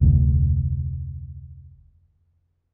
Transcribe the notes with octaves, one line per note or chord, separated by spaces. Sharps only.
F1 D2